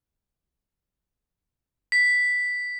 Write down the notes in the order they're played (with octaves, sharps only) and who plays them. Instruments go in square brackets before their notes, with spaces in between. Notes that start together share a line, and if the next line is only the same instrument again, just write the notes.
[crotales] B6